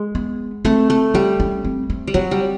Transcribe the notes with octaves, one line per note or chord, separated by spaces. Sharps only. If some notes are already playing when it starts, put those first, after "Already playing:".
Already playing: G#3
B3
A3 C4
A3
G3 C#4
C#4
C4
C4
G3
F#3 C4
G3